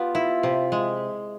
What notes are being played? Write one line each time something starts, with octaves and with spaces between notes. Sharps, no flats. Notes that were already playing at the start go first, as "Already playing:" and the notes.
Already playing: B3 F4 G4
E4
C3
G#3